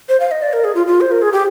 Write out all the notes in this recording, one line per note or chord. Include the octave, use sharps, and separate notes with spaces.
C5
F5
D#5
D5
A#4
G#4
F4
F4
C5
A#4
G#4
G4